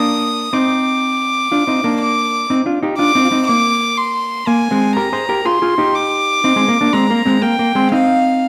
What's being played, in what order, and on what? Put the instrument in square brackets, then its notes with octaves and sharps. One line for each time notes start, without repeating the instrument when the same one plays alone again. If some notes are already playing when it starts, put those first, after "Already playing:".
Already playing: [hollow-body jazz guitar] A#3 D4 [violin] D#6
[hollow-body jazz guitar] C4 D#4 [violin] D6
[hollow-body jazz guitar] D4 F4
C4 D#4
A#3 D4
[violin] D6
[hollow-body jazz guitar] C4 D#4
D4 F4
D#4 G4
[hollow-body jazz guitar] D4 F4 [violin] D6
[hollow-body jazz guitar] C4 D#4
F4
C4 D#4
[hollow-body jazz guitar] A#3 [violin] D6
[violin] C6
[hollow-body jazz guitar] A#3 [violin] G#5
[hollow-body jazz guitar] G#3 C4
[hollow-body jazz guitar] G4 A#4 [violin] A#5
[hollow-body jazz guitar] G#4 C5
G4 A#4
[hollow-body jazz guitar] F4 G#4 [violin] C6
[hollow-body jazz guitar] F4 G#4
D#4 G4
[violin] D6
[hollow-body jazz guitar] C4 D#4
G#3 C4
A#3
A#3 D4
[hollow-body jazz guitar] G#3 C4 [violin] A#5
[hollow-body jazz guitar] A#3
G#3 C4
[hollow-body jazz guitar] A#3 [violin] G5
[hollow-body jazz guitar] A#3
G#3 C4
[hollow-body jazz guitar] C4 D#4 [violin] F5